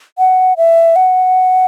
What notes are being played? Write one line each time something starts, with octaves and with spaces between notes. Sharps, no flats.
F#5
E5
F#5